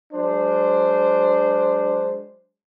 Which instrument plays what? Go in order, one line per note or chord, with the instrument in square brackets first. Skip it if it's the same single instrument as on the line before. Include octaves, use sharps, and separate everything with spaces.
[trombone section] F#3 G#3 D4 C5